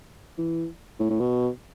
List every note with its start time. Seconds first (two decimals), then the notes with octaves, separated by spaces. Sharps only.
0.38 E3
1.00 A2
1.10 A2
1.20 B2